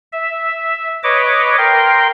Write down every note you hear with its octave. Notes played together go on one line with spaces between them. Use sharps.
E5
B4 C#5 D#5 D6
A#4 G5 C6